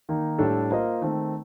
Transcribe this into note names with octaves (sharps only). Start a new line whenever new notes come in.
D#3 A#3 D#4
A2 G3 D4 A4
A#3 F4 C5 D#5
D#3 A3 C4